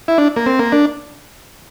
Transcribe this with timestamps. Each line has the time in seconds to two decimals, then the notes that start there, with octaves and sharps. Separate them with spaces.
0.08 E4
0.18 D4
0.36 A#3
0.46 C4
0.59 A#3
0.72 D4